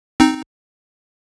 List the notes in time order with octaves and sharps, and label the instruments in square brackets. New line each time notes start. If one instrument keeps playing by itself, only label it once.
[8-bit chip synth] C4 D#4